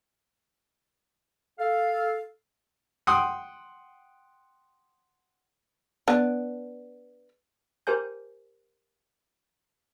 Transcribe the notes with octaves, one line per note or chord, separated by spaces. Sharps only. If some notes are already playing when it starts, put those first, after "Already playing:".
A4 F5
F#5 G5 C6 D#6
B3 D4
G4 A#4 C5 G#5 G6